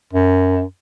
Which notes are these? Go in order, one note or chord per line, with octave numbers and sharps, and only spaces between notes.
F#2